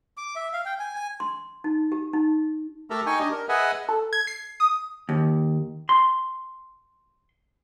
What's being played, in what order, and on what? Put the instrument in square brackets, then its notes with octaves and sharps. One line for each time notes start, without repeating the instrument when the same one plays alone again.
[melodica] D6
E5
F5
G5
G#5
G#5
[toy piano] C6
D#4
G4
D#4
[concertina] A3 G4 A4 A#4 E5 A#5
D#4 G5 G#5 C#6
D4 G4 D#5
A#4
G#4 B4 D#5 E5 F#5 G#5
[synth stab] A4
G#6
C7
D#6
[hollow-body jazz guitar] D#2
C6